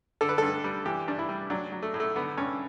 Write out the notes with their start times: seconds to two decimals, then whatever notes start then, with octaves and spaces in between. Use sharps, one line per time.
0.21 D3 A4
0.29 B4
0.38 G2 A4
0.64 G3
0.86 E3 G4
1.07 G2 D4
1.19 E4
1.29 G3
1.50 F#3 D4
1.72 F#3
1.83 A3
1.94 A2
2.00 A3
2.16 D3 B3
2.37 G2 C#4